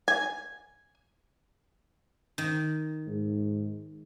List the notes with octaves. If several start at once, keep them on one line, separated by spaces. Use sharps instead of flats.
G#5
D#3
G#2